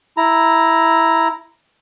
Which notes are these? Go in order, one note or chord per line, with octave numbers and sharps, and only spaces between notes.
E4 A#5